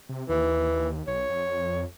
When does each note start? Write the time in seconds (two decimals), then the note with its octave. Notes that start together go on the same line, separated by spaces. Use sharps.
0.09 C3
0.29 D#2 E3
1.07 B1 C#5
1.29 F2